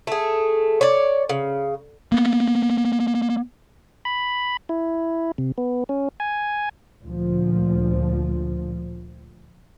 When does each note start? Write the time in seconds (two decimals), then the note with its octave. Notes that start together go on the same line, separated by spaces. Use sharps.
0.07 A3 G#4
0.81 C#5 D5
1.29 C#3
2.12 A#3 B3
4.05 B5
4.69 E4
5.38 C3
5.58 B3
5.89 C#4
6.20 G#5
7.02 D2 A#2 F3